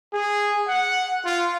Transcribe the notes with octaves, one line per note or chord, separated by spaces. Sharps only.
G#4
F#5
F4